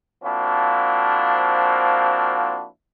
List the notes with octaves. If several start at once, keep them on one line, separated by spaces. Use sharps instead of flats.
F3 A#3 C4 D4 E4 F#4